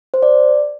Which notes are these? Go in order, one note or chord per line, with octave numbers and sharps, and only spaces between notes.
C5
D5